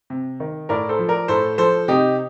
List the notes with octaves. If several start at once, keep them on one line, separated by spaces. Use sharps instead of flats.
C3
D#3
A2 A#4 D5
A4 C5
F3
A#4 D5
A2 A4 C5
F3 A4 C5
C3 D#4 G4